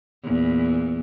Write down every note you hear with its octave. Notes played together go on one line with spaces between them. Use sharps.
E2 A#2